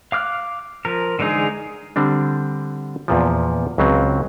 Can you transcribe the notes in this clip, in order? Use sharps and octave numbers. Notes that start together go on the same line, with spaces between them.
F5 D6 F6 F#6
F3 A#4
D3 E3 G#3 D#4 G#4
D3 G3 C4 D4
E2 A#2 F3
C#2 C#3 F#3 C4